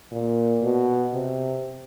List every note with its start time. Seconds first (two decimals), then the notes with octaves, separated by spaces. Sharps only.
0.12 A#2
0.63 B2
1.14 C3